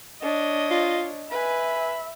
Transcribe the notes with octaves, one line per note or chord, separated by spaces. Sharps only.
D4 C#5 D#5
F4
B4 E5 G#5 B5